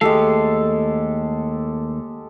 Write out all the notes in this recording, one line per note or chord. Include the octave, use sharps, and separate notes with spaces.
D#2 G#3 A3 G4 A4 F5